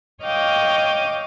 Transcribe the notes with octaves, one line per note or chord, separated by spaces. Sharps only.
C#5 D#5 F5 G5 D6 D#6